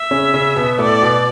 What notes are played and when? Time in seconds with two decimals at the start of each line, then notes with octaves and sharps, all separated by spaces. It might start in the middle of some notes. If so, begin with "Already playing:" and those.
Already playing: E5
0.11 C#3 C#4
0.34 C#3 C#4
0.56 B2 B3
0.78 A2 A3 D5
1.01 B2 B3